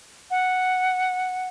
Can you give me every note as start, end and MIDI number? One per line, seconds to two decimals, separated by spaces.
0.31 1.49 78